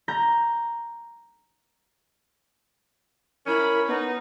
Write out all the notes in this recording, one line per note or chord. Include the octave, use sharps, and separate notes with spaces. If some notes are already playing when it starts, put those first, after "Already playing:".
A#5 G6 A#6
C#4 E4 A#4 B5
B3 D#4